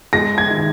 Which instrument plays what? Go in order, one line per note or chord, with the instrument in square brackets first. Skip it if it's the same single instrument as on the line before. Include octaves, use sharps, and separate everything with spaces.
[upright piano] G#3 [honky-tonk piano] A#6
[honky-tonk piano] G#6
[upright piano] D#3